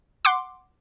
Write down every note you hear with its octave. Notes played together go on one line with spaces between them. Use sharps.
F#5 C6 D6